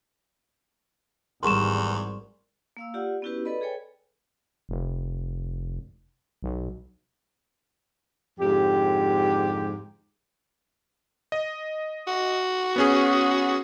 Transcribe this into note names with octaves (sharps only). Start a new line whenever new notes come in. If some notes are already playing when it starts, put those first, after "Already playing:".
G#1 E2 G3 G#4 A#4 C6 C#6 E7
A#3 F5 E6
F4 G4 D5 F#5
B3 C#4 E4 F#4 G4 B4
A4 B4 D5 D#5 B5
G#4 A4 B4 C#5 G5 G#5
F1
B1
F2 G#2 D3 G4
D#5
F#4
B3 C#4 G#4